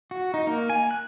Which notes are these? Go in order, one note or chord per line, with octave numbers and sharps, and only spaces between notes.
F#4
D#4
A#3
G#5
F#6